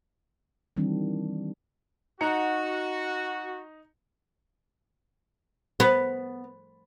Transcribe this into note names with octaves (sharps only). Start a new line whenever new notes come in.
D#3 E3 G3 C4 D4
D#4 F#4 A#5 C#7
B3